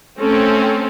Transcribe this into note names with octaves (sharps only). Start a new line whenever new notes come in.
A3 C4 C#4 A4